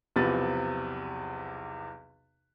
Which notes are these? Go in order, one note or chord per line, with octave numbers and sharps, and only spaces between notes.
B1 E2 C3 F3 B4 A6